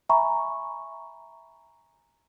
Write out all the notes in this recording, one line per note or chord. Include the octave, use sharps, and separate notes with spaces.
E5 G#5 A#5 B5 C#6